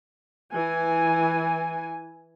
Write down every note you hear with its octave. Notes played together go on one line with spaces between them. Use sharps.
E3 G#5